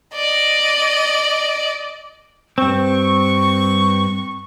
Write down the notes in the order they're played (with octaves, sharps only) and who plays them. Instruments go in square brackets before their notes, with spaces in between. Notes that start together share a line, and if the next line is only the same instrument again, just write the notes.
[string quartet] D5 D#5
[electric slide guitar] G2 C4 [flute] C#6